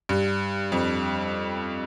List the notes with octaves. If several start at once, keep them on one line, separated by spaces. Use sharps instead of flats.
G2
F2